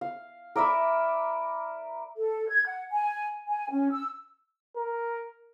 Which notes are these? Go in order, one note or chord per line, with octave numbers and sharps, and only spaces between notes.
F5
A#4 D5 E5 B5
A4
G#6
F#5
G#5
G#5
C#4
E6
A#4